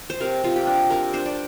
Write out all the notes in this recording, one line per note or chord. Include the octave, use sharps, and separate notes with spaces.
C5
C3 A#4
C3 F4
G4
D4
C3 A#4
D4 C5
D5